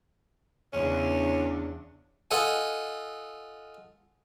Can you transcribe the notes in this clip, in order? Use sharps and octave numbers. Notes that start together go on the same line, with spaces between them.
E2 C#3 C#4 D4
F4 A4 D#5 F#5 G#5